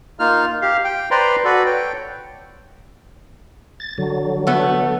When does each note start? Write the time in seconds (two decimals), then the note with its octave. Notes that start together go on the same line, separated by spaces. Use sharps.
0.20 A#3 D#4 F4 F6
0.62 G4 F5
0.84 G5
1.11 B4 C5 D5 G5 A#5 C6
1.44 F#4 A4 B4 D5
1.66 C#5 G5
3.80 A6
3.98 D3 F#3
4.47 A3 B3